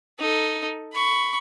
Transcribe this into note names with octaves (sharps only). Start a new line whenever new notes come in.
D#4 A4
B5 C#6